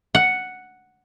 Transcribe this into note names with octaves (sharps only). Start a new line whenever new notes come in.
F#5